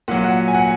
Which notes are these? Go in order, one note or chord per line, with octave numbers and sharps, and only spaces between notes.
A#2 F#3 F#5
F#5
G#5
F#5